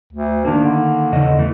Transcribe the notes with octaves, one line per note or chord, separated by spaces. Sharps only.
D2
D#3 A#3 D4
D3
E2 C#3 D#5
E3 A3